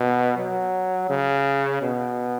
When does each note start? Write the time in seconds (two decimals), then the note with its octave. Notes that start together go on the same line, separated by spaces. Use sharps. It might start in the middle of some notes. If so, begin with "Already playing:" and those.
Already playing: B2
0.37 F#3
1.10 C#3
1.82 B2